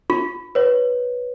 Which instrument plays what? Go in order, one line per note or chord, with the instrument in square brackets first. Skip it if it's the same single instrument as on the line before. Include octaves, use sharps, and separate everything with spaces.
[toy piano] F4
[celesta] B4 C#5